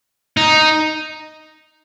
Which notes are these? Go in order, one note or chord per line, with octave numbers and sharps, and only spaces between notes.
D#4